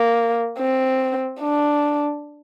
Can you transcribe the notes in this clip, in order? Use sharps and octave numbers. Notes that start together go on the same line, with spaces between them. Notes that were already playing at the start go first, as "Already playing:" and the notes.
Already playing: A#3
C4
D4